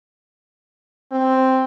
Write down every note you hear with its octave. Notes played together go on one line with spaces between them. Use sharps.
C4